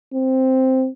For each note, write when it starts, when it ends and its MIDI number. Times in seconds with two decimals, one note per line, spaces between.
0.14 0.89 60